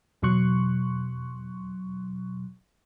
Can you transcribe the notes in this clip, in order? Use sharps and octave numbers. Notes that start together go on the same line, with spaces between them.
E2 B2 F#3 C6 C#6 F#6